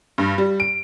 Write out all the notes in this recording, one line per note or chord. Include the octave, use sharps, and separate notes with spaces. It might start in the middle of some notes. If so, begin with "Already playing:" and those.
G2
G3
D7